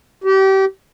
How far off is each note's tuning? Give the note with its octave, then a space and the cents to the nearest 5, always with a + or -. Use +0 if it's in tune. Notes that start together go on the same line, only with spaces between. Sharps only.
G4 -30